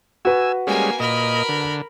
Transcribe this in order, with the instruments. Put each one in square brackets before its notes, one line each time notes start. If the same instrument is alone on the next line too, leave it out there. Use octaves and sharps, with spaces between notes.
[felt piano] F#4 B4 [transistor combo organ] G#5 E6
[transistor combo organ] G3 G#3 C#4 [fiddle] A#3 G#5
[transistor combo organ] A#2 D#5 [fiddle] A#4 B5
[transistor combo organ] D3